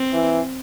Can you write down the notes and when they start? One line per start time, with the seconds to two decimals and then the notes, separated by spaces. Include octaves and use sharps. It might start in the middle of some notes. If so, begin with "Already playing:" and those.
Already playing: C4
0.13 E3